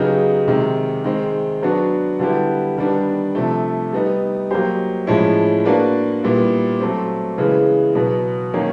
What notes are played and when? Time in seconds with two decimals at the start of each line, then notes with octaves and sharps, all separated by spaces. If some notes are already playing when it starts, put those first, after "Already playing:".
Already playing: C#3 F#3 B3 D#4 G4
0.48 C3 D#3 G#3
1.04 D#3 G#3 C4
1.63 F#3 B3 D4 F#4
2.19 D3 G3 B3 E4 G4
2.77 D#3 G3 B3 D4
3.35 C3 F3 A3
3.93 G3 B3 D#4
4.51 F#3 A#3 D#4 G4 C5
5.07 A2 F3 G#3 C#4 E4
5.65 A#3 D4 F#4 B4 D5
6.23 A#2 G3 B3 E4
6.80 F#3 A3 C4
7.38 C#3 E3 G#3 B3
7.95 B2 F#3 B3
8.54 D#3 F#3 A#3 C#4